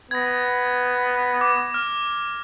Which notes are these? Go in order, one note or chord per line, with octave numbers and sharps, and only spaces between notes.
B3 G#6 A#6
D6
F6